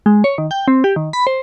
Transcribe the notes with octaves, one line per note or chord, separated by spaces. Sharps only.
G#3
C#5
D#3
G5
C4
G4
D#3
B5
C5